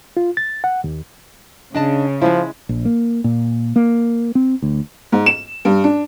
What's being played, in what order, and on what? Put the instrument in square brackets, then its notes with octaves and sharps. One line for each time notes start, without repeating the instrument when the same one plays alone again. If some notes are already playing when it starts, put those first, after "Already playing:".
[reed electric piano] F4
A6
F#5
D#2
[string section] C#3 [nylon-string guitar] D4 D#5 A5
[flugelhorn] F3 [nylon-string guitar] G#3 E4
[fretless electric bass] A#1
A#3
A#2
A#3
C4
D2
[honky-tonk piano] G#2
E7
G2
D4